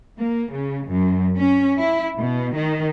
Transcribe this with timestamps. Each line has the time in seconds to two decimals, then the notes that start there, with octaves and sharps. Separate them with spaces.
0.18 A#3
0.51 C#3
0.88 F#2
1.38 C#4
1.77 E4
2.17 B2
2.55 D#3